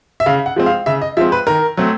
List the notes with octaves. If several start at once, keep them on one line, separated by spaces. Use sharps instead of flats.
E5
C#3 F5
F#5
F3 G#3 C4
F5
C#3 E5
D#5
F3 G#3 C4 E5
B4
D#3 A#4
F#3 A3 C4